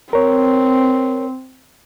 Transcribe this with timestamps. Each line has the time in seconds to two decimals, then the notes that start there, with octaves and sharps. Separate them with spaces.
0.13 C4 A#4 C#5